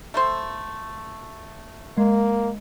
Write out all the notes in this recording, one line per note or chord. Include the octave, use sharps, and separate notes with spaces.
A3 A4 C5
G#3 A#3